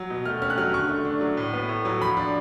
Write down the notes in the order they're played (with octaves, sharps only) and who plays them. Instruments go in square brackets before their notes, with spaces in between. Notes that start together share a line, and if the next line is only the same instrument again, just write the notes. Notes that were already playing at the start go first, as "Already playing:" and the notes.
Already playing: [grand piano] F#3
B2
A3 F6
C#4 F6
F#6
F#3 F6
D3 C#6
A3
D4
F#3
A2
B3
A2
F#3
F3 B5
D4